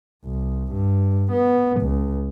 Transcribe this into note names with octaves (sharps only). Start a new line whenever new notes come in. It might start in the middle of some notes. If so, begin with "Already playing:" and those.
C2
G2
B3
C#2